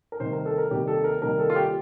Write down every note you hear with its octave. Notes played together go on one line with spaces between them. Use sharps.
A#4
C3 D#3 G3 A#3 C5
A#4
A4
A#4
C3 D#3 G3 A#3 G4
A4
A#4
C3 D#3 G3 A#3 A#4
A4
F4
G4